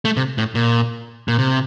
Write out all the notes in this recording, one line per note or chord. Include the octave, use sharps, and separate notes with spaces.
A3
C3
A2
A#2
A#2
C3